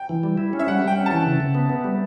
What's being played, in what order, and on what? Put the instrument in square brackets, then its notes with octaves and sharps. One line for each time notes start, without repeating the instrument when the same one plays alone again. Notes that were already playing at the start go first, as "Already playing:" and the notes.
Already playing: [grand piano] G5
[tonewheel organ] E3
G3
E4
C#4
[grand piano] E5
[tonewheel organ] G3 [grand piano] F#5
[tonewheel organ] G3
[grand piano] G5
[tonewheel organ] C#4
[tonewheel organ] E3 [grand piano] A5
[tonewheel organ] C#3
C#3
B3
B3
G3